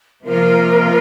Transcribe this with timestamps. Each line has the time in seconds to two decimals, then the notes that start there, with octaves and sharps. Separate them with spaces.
0.24 C3 F3 A#3 F4 A#4